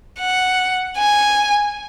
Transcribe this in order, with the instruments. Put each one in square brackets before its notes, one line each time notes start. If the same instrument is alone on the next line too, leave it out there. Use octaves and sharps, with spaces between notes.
[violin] F#5
G#5